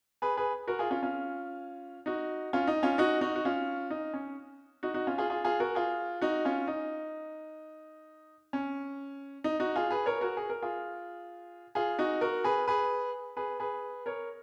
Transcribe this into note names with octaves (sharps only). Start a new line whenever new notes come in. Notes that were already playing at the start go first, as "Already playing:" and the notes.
G#4 B4
G#4 B4
F#4 A#4
F4 G#4
C#4 F4
C#4 F4
D#4 F#4
C#4 F4
D#4
C#4 F4
D#4 F#4
D#4 F#4
F#4
C#4 F4
D#4
C#4
D#4 F#4
D#4 F#4
C#4 F4
F4 G#4
F4 G#4
F4 G#4
F#4 A#4
F4 G#4
D#4 F#4
C#4 F4
D#4
C#4
D#4
D#4 F#4
F4 G#4
G#4 B4
A#4 C#5
F#4 A#4
G#4
A#4
F4 G#4
F4 G#4
D#4 F#4
F#4 A#4
G#4 B4
G#4 B4
G#4 B4
G#4 B4
A#4 C#5